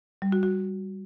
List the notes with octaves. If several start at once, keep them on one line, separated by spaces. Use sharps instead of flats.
G3
F#4
F#4